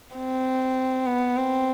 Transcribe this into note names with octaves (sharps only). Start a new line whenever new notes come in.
C4
B3
C4